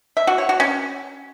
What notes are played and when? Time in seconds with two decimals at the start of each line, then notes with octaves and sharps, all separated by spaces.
0.17 E5
0.27 F#4
0.38 C#5
0.49 F#4
0.60 C#4